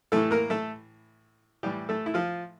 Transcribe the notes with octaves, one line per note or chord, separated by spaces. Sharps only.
A2 E3 A3 A4
A#3 A#4
A3 A4
A2 E3 G3 G4
A3 A4
E4
F3 F4